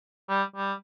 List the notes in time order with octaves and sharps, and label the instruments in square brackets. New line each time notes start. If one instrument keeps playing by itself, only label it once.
[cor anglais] G3
G3